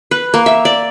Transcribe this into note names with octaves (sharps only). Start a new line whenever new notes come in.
B4
A#3
E5
D5